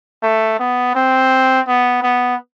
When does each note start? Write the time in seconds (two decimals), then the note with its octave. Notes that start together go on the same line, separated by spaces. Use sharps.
0.23 A3
0.59 B3
0.95 C4
1.67 B3
2.03 B3